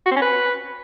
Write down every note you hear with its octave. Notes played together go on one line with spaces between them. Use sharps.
F#4
C4
C#4
B4